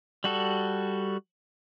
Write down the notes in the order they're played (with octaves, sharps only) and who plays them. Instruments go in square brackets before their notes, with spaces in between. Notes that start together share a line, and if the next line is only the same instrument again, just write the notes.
[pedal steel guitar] G3 F#4 A4